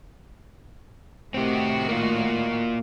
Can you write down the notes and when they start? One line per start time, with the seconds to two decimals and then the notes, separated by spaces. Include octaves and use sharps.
1.34 A2 D#3 C4 F#4 G4
1.89 A#3 F4